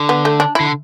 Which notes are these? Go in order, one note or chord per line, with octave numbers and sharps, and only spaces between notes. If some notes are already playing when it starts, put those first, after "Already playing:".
Already playing: D3
B3
A3
D4
D3 E4